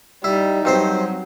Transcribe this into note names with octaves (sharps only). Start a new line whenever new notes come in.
G3 D#4 E4
G2 F#3 C4 C5